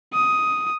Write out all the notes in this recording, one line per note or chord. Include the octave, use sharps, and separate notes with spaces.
D#6